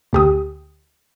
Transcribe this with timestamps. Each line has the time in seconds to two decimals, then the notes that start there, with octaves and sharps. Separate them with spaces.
0.13 D2 G4 D#6